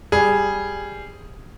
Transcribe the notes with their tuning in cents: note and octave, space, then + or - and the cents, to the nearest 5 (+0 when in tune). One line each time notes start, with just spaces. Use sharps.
G3 +0 G#4 +0